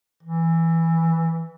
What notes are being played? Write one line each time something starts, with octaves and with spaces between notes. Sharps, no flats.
E3